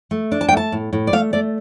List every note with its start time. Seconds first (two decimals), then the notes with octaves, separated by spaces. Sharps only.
0.11 A3
0.32 D4
0.41 A5
0.48 G5
0.52 A3 A5
0.72 A2
0.93 A2
1.07 D5
1.13 A3 F5
1.33 A3 D5